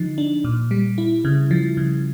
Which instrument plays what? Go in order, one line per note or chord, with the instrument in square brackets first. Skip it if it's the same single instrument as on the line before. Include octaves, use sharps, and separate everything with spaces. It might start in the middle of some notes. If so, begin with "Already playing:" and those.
Already playing: [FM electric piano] D3 F3 D#4
D4
A#2
G3
E4
C#3
F3
C#3